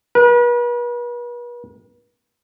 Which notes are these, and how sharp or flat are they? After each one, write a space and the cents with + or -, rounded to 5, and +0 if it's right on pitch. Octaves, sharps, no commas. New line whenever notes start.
B4 -40